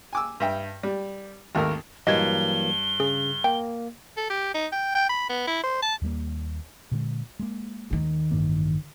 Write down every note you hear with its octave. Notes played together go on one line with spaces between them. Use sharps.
G#5 D6 E6
G2 E5 G5
G3
G#1 D#2 A3 A#3 A#4
G2 E3 F#3 A#3 D#5 G#6 G7
C#3 G#4
A#3 G5
A4
G4
D#4
G5
G5
B5
B3
E4
C5
A5
D#2 G3 A#3
A#2 D3 G#3
G#3 A#3
D#2 D#3
A1 G2 A#3